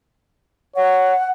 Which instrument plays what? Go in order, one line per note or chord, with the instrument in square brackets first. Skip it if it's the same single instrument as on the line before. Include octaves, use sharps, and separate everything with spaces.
[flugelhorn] C#5 [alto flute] F#5